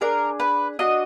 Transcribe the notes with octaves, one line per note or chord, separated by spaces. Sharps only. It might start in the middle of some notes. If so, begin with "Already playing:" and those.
D4 G#4 A#4
B4
D4 F#4 D#5